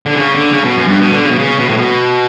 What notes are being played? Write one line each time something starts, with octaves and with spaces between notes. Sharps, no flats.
D3
C#3
D3
C#3
B2
F#2
G2
B2
D3
C#3
B2
C#3
B2
A2
B2